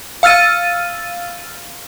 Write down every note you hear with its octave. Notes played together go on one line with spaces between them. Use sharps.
F5 E6 F6 A6 D#7